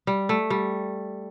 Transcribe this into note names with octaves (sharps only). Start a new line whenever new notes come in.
G3
A3
G3